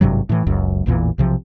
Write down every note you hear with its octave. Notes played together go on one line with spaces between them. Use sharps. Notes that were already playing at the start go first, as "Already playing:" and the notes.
G#1 G2 C3 F#3
A2 E3
F#1 C#2 F#2
A1 E2 A#2 E3
B1 C3 F3